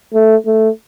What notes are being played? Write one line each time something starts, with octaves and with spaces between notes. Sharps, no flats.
A3
A3